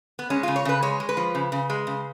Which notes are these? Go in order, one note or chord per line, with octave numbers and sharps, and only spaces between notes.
B3
G#3 C#4
C#3 F4
C#5
C#3 B4
G#3 C#5
G#3
B4
F3
C#3
C#3
G#3
C#3